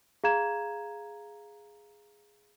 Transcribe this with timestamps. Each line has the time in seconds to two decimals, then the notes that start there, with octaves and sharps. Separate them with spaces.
0.24 G#4 F5 A#5 G#6 E7